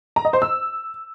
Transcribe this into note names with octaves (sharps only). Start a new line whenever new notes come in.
A#5
D#5
C5
E6